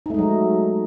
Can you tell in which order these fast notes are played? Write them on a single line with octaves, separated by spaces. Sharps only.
D#4 A3 G#3 F#3